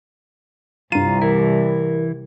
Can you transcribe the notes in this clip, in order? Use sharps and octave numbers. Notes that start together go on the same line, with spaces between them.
C2 G2 F4 A#5 D#7
E3 E4 A#4